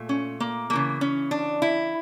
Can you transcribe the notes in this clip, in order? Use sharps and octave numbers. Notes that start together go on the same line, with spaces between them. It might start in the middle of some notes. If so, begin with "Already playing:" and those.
Already playing: A#2 A3
C#4
A#3
C#3 E3 A3 A#3
C#4
D4
E4